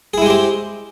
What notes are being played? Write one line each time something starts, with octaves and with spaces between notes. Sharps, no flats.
G#3 C4 E4 G4 G#4